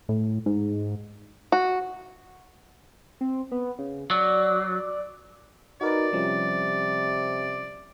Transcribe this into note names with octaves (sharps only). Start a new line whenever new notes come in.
A2
G#2
F#4
C4
B3
C#3
F#3 D5
D#4 F#4 A#4 B4 D5
C3 F3 G3 C#4